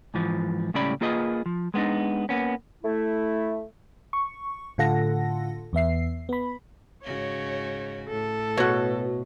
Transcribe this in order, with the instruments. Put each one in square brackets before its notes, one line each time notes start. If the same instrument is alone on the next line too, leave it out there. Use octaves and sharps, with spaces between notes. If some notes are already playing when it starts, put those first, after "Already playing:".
[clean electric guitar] G#2 E3 F3
C#2 A2 G3 C#4 D5 B5
A#3 F4 G#4 B4 D#5
F3
G#3 B3 C4 D4 D#4
A#3 B3 C#4
[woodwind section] A3 E4
[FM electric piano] C#6
A2 D3 F4 A4 F#5 A#6
E2 B3 E5 C7
B3 B5
[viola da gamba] G#2 C#3 F#4 [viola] C#5
[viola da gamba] A2 [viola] A4
[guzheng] B2 [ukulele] F#4 C#5